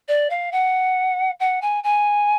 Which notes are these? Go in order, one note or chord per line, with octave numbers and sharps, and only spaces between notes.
D5
F5
F#5
F#5
G#5
G#5